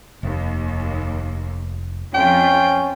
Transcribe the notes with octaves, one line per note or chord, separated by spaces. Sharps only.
F1 D#2
F2 C#4 F4 G5